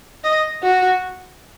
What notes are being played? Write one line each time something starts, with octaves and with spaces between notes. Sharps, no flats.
D#5
F#4